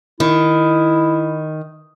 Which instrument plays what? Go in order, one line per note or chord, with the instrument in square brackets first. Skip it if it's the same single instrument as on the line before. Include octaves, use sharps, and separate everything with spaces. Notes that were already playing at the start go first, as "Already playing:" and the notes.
[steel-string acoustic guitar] D#3 [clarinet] E4